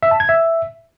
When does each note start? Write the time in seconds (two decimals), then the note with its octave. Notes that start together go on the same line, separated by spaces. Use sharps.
0.03 E5
0.11 A5
0.20 G#6
0.29 E5